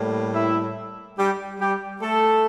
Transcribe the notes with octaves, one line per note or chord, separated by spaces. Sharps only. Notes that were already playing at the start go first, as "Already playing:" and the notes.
Already playing: A2 G3 A#3
E4 E5
G3 G4
G3 G4
A3 A4